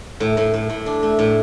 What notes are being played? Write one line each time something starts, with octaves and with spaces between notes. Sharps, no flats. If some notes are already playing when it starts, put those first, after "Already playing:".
A2
A2
A2
A2
D4
A3
A2